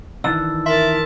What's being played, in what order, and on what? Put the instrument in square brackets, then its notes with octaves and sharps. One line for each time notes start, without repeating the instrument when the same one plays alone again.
[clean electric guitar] D#3 E3 D4 [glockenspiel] E6
[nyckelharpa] A#4 A5 [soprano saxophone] E5 [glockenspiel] C6 B6